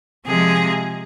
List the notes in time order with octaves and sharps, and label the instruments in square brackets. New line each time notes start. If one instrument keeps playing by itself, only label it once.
[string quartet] C3 F3 G#3 G#4